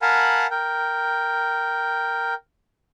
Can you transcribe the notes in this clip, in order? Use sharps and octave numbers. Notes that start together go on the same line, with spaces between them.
A#4 F5 F#5 G#5 A5 B5
A#4 G5